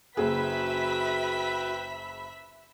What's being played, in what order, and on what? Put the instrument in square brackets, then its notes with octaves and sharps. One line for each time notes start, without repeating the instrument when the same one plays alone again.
[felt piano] F#1 G#4 [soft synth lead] F#4 [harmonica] B4 G5 [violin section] E5 B5 B6